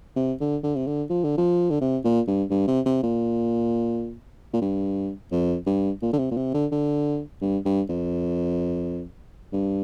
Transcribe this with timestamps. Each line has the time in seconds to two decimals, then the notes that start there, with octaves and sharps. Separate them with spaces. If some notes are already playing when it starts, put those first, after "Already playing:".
0.16 C3
0.40 D3
0.64 D3
0.76 C3
0.87 D3
1.10 F3
1.24 D3
1.37 F3
1.70 D3
1.81 C3
2.04 A#2
2.27 G2
2.50 G2
2.68 C3
2.86 C3
3.03 A#2
4.53 A#2
4.61 G2
5.32 F2
5.66 G2
6.02 A#2
6.13 D3
6.18 C3
6.31 A#2
6.37 C3
6.54 D3
6.71 D3
7.41 G2
7.65 G2
7.89 F2
9.53 G2